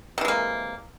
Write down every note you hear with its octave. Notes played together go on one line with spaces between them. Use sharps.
C3 E3 G#3 A#3